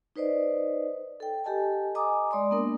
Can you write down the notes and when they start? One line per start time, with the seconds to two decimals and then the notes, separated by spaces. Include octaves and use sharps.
0.16 D#4 B4 C5 D5 D#5
1.20 A4 G5
1.44 G4 A4 D#5 G#5 A5
1.95 D#5 G#5 A#5 D6 D#6
2.31 G#3 D5 C6 D#6
2.51 A#3 B3 D4 A#4